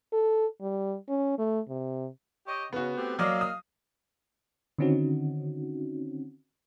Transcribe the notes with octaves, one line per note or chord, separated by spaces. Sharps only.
A4
G3
C#4
A3
C3
G4 C#5 D#5
C#3 B3 F#4
A3 C4 G4
F#3 A#3 D5 D#5 F5 D6
D#6
D3 D#3 C4 C#4 D#4 F#4